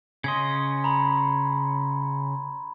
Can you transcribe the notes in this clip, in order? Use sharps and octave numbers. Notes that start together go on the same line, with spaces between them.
C#3 C#4 D#5 C6 G#6
A#5 B5